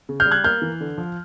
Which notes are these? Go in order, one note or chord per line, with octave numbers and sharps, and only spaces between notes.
C#3
F6 G6
G3
F#6 G#6
A#3 F6 G6
E3
D3
F3